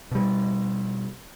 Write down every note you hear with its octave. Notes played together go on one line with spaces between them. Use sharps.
B2 G3